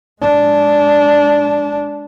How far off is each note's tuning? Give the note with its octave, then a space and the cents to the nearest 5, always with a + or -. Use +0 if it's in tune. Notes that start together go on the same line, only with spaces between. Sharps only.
G#3 +0 D4 -10